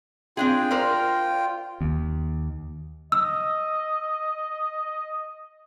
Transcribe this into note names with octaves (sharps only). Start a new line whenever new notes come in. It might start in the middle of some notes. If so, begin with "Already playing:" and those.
C4 D4 F4 G#4 G5
A#4 C5 D5
D#2
D#5 E6